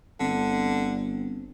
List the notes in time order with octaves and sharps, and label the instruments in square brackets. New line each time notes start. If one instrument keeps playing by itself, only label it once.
[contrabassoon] G1 [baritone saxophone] D3 [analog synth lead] C4